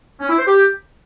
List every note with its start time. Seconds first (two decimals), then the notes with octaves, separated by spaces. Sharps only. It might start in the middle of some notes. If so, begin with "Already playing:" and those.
0.20 C#4
0.29 E4
0.38 C5
0.47 G4